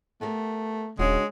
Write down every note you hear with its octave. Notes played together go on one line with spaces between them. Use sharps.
A3 B3 G4 A#4
D#1 C#3 G#3 D4 F#4 C#5